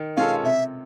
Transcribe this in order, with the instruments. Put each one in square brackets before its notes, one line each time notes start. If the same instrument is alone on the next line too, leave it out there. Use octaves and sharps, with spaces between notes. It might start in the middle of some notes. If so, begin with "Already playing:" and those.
Already playing: [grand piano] D#3
[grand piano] G#3 C#4 F4 A4 [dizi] F5
[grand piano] C3 [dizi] E5